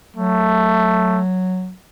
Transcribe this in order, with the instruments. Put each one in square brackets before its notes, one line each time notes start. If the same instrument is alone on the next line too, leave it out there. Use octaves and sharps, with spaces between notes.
[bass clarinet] F#3 [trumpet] A3